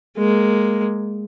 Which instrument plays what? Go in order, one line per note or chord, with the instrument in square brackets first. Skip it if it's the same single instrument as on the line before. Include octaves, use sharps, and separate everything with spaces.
[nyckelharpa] G#3 A#3